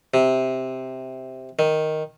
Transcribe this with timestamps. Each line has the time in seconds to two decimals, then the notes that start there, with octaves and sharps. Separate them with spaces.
0.14 C3
1.59 D#3